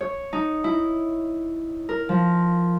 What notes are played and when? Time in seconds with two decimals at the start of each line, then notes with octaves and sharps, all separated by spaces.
0.01 C#5
0.33 D#4
0.64 E4
1.89 A#4
2.09 F3